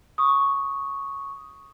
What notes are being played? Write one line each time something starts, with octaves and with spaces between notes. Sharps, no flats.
C#6 D#6